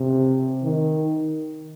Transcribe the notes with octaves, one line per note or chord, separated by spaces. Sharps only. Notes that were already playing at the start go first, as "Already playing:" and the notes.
Already playing: C3
D#3